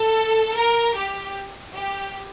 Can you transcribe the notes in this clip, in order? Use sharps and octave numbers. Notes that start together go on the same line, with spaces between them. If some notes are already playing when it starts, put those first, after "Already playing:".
Already playing: A4
A#4
G4
G4